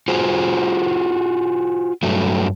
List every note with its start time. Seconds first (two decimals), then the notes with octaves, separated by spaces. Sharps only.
0.08 F4 F#4 G#4 C5
2.03 G2 F#3 A3